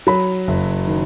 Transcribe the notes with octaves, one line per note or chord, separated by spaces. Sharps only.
F#3 B5
F#1
D#3